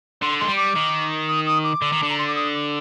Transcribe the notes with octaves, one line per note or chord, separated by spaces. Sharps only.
D3 C6
G#3 C6
G3
D6
D#3
D#6
D#6
D6
D3
D#3
D3
A#5
C6
D6
D#6
D6